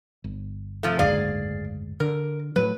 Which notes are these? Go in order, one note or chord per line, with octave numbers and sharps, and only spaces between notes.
G1
C3 F3 A3
F#1 D2 G#2 G#4 D5 F5
D3 A#4
A2 F#3 B4